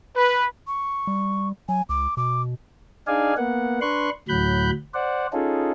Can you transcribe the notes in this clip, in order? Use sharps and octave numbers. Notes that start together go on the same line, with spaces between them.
B4
C#6
G3
F#3 G#5
C#2 D6
B2 D6
D4 D#4 G#4 D5 F5 G#5
A#3 B3 F#5
D4 B4 C6 C#6 F#6
D2 A2 F#3 B5 F#6 G6
C5 D5 F#5
C#4 D#4 F4 G#4 A4